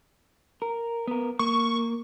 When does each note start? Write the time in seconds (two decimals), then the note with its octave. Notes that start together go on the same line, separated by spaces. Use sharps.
0.62 A#4
1.07 B3 A#4
1.39 A#3 C#6